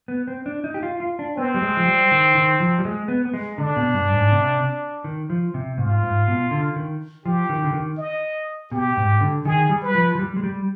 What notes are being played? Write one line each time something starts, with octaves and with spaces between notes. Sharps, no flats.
B3
C4
D4
D#4
G4
F4
F4
D4
B3 C4
G3
G#3
F3
G3
D#3
D#3
F3
G3
G#3
B3
B3
G#3
D3 D4
B2
G2
G#2
C3
D#3
F3
C3
G#2 F4
G#2
B2
D3
D#3
F3 G4
D#3
D3
D#3
D#5
B2 G4
G#2
D3
D#3 G#4
G3
B4
F3
F3
G3
G#3
G3